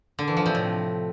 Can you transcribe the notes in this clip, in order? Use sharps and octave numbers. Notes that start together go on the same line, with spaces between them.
D3
E3
F3
C3
A2